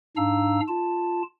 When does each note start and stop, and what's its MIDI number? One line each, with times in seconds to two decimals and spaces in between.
0.17 0.60 44
0.17 0.60 62
0.17 0.60 77
0.17 0.60 82
0.17 0.60 88
0.68 1.23 65
0.68 1.23 81